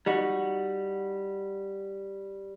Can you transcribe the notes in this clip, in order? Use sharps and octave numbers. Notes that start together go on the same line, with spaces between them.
G3 D#4 F#4